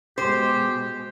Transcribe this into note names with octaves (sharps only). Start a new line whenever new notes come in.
B2 G#3 G4 C5